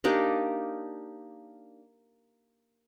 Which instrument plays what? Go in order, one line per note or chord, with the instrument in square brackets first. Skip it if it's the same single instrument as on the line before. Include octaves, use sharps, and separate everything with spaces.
[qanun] A#3 D4 D#4 G4